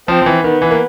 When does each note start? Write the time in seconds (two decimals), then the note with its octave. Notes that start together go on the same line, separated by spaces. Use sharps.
0.08 F3 C4
0.22 F3
0.26 E3
0.43 D#3 B3
0.62 E3
0.71 A#3